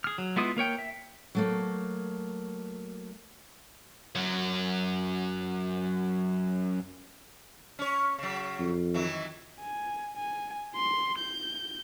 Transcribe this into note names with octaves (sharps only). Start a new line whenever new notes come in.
G#4 F6
F#3
G#3 B3 E4 F4 D#6
A#3 A#4 C#5 G5
E5
F#3 A3 A#3
F#2 F#3
C#4 C#5
C#3 F#3
F2
D#3 E3 F#3
G#5
G#5
C6
G6